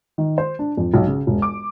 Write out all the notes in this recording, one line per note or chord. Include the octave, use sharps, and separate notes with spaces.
D#3
C5
D4
F2
B1
C#3
E1
D6